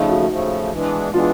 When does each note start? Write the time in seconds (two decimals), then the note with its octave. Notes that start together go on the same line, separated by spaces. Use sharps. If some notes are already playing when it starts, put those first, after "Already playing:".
Already playing: C#3 F3 A3 D#4
0.09 F#4
0.29 C#3 F3 A3
0.71 E3 G#3 B3 D4
1.13 E3 G#3 B3 D4 F4